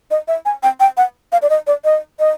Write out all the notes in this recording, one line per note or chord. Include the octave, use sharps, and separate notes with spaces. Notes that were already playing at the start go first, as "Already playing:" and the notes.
D#5
E5
G#5
G5
G5
F#5
F5
D5
D#5
D5
D#5
D#5